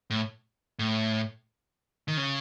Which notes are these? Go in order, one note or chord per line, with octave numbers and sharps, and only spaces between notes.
A2
A2
D#3
C#3